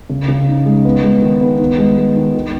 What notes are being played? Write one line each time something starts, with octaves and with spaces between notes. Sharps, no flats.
C#3
C#3
D#4
G#3
B3
G#3
D#3
B3
D#3
G#3
G#3
D#3
D#3